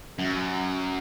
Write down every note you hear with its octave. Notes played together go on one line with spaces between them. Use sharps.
F#2